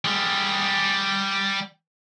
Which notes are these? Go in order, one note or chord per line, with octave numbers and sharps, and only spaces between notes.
G3 G#4